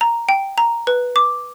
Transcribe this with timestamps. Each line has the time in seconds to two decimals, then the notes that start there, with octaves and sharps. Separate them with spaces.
0.01 A#5
0.29 G5
0.58 A#5
0.87 B4
1.16 D6